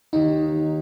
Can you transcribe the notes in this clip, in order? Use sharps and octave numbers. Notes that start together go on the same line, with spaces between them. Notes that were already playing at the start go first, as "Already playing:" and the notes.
D#2 D#3 D#4